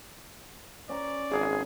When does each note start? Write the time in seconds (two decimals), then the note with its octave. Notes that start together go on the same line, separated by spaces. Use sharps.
0.89 C#4 D5 A#5
1.31 G#1 G#4